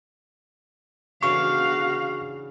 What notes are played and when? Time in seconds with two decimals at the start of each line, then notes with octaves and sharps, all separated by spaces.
1.23 C#3 E3 D4 F#4 F5 C#6